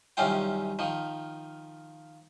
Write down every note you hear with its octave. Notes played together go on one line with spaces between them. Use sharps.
C2 F#2 D#3 C#4 F4 G5
D#3 F3